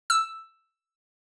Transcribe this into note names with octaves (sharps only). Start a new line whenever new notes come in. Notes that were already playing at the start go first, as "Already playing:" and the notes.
E6